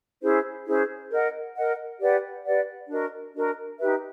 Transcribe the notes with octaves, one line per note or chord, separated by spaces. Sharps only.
C#4 E4 G#4 C5
C#4 E4 G#4 C5
A#4 D#5 F#5
A#4 D#5 F#5
G4 B4 D5 F#5
G4 B4 D5 F#5
D4 F#4 A#4 D#5
D4 F#4 A#4 D#5
D#4 G4 B4 E5